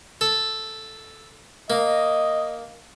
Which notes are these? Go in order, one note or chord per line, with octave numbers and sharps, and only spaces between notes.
A4
A#3 D#5